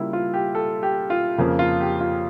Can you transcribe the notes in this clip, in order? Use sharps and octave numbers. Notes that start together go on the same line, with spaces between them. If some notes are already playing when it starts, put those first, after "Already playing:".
Already playing: C#3 G3 A#3 E4 F4
F4
G4
A4
G4
F4
F2 C#3 F3 A#3
F4
G4
F4